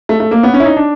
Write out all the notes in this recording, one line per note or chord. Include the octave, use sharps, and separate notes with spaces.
A3
A3
A#3
B3
C#4
E4
D#4
D4